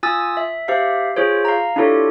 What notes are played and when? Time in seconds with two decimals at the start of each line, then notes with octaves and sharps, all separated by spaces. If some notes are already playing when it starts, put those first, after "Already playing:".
0.03 F4 G#5 D#6 E6 A6
0.37 E5
0.68 G4 C5 E5 F5
1.16 F4 G#4 C5 C#5
1.45 F5 A#5
1.76 D4 E4 F4 G4 A4 C#5